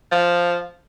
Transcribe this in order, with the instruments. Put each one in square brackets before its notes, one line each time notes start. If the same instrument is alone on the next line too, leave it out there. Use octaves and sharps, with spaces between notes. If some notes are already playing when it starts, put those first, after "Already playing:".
[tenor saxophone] F3